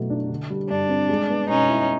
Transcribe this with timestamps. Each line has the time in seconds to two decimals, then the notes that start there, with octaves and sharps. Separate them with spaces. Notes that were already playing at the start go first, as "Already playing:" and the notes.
Already playing: B2 F#3 A3
0.10 D4
0.30 D3
0.50 G3
0.70 G2 D4
0.89 C4
1.09 G#3
1.29 B3
1.49 B2 C#4 D#4
1.68 E4